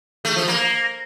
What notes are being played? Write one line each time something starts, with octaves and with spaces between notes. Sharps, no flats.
A3
F3
A#3